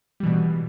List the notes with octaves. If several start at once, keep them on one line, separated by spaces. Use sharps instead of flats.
B2 E3 G3